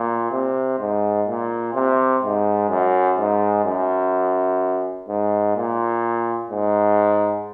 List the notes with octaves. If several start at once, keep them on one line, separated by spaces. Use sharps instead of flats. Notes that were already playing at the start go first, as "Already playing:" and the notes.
Already playing: A#2
C3
G#2
A#2
C3
G#2
F#2
G#2
F#2
G#2
A#2
G#2